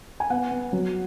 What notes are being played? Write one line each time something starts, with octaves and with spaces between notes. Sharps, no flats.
G#5
B3 F#5
B3
F#3